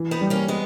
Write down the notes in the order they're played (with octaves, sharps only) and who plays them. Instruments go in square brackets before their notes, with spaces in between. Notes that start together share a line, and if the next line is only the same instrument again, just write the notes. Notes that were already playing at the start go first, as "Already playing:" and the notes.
Already playing: [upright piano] E3
[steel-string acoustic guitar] B3 D#4
[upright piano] G3
[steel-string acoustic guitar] A#3 C#4
G#3 B3